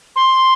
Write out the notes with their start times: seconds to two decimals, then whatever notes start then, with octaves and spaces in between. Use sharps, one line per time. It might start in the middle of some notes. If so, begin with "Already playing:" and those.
0.16 C6